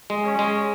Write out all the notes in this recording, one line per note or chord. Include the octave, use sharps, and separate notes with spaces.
G#3
C#4
G#3